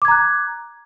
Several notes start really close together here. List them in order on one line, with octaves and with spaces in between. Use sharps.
D6 G#6 A#5 F#6